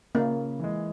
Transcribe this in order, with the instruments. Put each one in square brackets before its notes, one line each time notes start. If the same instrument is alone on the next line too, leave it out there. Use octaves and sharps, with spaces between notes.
[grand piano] C#3 [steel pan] A#3
[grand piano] E3 G#3